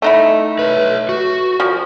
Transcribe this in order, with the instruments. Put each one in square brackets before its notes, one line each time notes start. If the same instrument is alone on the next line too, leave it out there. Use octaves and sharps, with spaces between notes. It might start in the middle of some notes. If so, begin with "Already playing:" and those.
[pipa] A3 D#4 E4
[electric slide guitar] B4 C#5
F#4
[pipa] F3